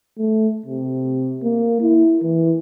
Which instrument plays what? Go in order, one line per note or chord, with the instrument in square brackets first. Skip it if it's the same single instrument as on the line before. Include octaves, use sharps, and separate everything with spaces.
[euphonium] A3
C3
A#3
E4
E3